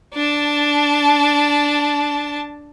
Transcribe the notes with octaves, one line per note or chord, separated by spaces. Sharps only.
D4 A5